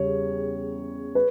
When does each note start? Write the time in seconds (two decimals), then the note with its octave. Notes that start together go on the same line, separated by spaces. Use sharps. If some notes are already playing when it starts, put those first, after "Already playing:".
Already playing: E2 C#3 G3 C#5
1.15 B4